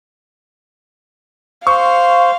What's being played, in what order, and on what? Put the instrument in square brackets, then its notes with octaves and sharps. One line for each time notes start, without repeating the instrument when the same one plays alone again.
[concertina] C5 [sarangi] F5 [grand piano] C#6